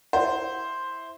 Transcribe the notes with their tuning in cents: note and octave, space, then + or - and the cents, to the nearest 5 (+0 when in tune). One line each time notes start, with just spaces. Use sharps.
E4 +0 C5 +0